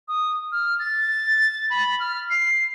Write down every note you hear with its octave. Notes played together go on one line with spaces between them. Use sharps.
D#6
F6
A6
B5
F6
C7